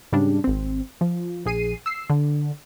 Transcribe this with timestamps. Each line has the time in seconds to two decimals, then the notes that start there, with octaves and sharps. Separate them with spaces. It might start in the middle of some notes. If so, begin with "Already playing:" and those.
0.12 G#2 C#3 G3 D4
0.44 G#1 C4
1.01 F3
1.46 A#1 G#4 C7 D#7
1.86 E6 C7
2.10 D3